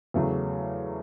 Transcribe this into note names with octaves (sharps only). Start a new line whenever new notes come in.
E2 C#3 F#3 A3 E4